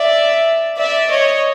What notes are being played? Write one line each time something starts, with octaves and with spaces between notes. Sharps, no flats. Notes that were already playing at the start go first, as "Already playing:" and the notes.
Already playing: D5 E5
D5 E5
C#5 D#5